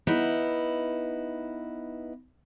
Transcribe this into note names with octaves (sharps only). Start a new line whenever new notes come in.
B3 D#4 E4